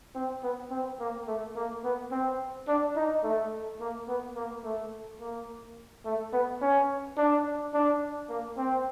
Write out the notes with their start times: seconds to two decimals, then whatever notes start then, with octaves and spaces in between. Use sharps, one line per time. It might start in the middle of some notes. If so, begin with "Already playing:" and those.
0.15 C4
0.43 B3
0.71 C4
1.00 A#3
1.28 A3
1.56 A#3
1.84 B3
2.12 C4
2.68 D4
2.96 D#4
3.24 A3
3.80 A#3
4.08 B3
4.36 A#3
4.64 A3
5.20 A#3
6.05 A3
6.33 B3
6.61 C#4
7.17 D4
7.74 D4
8.29 A#3
8.58 C4